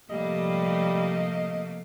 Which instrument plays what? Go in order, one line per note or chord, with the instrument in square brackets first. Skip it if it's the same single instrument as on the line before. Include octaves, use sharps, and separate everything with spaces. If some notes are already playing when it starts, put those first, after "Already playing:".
[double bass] C3 F3 [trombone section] G3 [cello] A3 A#3 [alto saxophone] D#5